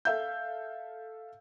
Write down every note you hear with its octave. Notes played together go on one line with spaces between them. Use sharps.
A4 E5 F5 G6